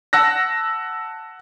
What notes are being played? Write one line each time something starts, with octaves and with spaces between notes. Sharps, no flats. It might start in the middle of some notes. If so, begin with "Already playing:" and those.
F#5 A5 E6 F#6 A#6